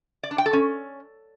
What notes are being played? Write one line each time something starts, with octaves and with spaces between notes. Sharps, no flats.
D5
D4
G5
A4
C#4